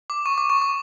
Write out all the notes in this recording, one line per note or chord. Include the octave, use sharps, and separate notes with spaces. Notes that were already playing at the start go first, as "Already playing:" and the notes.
D6
C#6
D6
C#6
D6